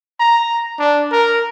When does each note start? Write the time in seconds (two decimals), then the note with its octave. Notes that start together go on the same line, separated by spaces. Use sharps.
0.20 A#5
0.79 D4
1.12 A#4